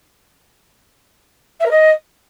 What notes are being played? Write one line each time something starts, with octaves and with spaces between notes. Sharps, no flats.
E5
A#4
D#5